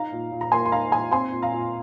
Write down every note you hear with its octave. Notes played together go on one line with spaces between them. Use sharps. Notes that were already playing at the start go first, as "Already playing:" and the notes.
Already playing: D#4 F5 A#5
A#2
A#2
A#5
A#3 G#5 C6
C6
D#4 F5 A#5
A#2 G#5 C6
C4 G#5 C6
A#2
F5 A#5
A#2